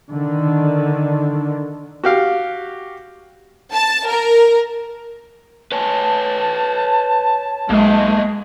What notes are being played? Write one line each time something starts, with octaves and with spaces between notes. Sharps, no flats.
D3 D#3
F#4 G4 F5
A5
A#4
B4 C#5 G#5 A5
B1 G#3 A#3 E5